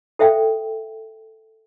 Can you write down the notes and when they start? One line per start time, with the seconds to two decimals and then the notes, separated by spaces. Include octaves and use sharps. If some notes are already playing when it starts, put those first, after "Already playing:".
0.19 A4 C5 E5 F5 G5